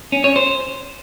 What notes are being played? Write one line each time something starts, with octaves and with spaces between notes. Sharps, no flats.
C#4
C#5
C5